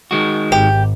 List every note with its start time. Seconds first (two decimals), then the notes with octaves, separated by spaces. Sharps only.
0.11 D#3 G#3 F#4
0.52 G#1 G4